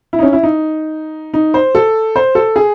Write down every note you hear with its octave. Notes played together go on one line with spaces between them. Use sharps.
E4
D#4
C#4
E4
D#4
D#4
C5
A4
C5
A4
G#4